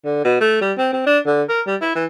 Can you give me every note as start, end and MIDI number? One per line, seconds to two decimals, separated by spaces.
0.05 0.21 50
0.25 0.39 47
0.41 0.58 57
0.61 0.73 55
0.78 0.89 60
0.93 1.05 60
1.06 1.19 62
1.26 1.43 50
1.49 1.61 70
1.67 1.75 55
1.81 1.93 64
1.95 2.05 52